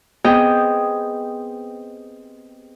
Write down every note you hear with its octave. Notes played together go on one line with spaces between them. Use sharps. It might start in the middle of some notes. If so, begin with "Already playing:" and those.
B3 C4 G4 G#4 D#5 G5